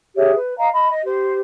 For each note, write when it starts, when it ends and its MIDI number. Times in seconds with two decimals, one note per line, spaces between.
0.16 0.34 67
0.16 0.34 68
0.16 0.34 73
0.16 0.34 76
0.35 0.56 71
0.58 0.67 75
0.58 0.67 77
0.58 0.67 82
0.73 0.89 75
0.73 0.89 83
0.89 1.01 75
1.04 1.40 67
1.04 1.40 72